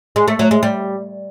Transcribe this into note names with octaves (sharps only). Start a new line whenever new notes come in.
G#3
A3
F#3
G#3
G3